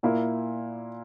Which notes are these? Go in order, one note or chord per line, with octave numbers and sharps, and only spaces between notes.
A#2 A#3 E4